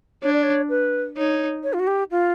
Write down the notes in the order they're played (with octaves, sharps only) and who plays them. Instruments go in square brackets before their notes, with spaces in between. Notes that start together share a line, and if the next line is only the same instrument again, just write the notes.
[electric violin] D4 [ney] C#5
[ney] D5
C#5
B4
[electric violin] D#4 [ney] C#5
[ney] C#5
F4
F#4
G4
F4